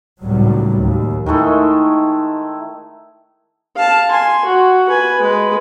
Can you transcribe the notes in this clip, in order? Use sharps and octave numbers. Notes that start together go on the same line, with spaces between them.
G#1 C#2 A2 F#3 G3
D#2
D#3 G#3 A3 E4
F5 A5
G#5 C6
F#4
B4 G#5
G#3 B4